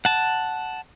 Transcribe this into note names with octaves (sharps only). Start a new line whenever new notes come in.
F#5 A5